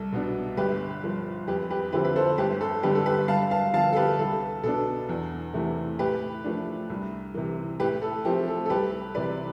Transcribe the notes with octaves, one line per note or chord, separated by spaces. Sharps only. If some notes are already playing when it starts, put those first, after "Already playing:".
Already playing: C2 A4
B2 B3 D4
G1 G4 B4
G2 F3
F2 G4 B4
G4 B4
D3 F3 C4 E4 G4 B4
B4
A4 C5
G1 G4 B4
A4
G2 D3 G3 B3 G4 B4
A4
G4 B4
G2 F5 A5
F5 A5
D3 F3 B3 F5 A5
A4
G4 B4
C2 A4
B2 B3 D4 A4
E2
C3 E3 A3
A2 G4 B4
F3 A3 D4
C2
C3 E3
A2 G4 B4
A4
F3 A3 C4 G4
A4
A4
C2 G4 B4
C3 E3 B4 D5